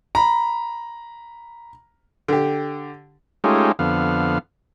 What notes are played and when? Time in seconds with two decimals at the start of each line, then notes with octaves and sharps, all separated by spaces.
0.15 A#5 B5
2.28 D3 G4
3.44 G#3 A3 C#4 D#4 F4 G4
3.79 F2 D3 B3 F5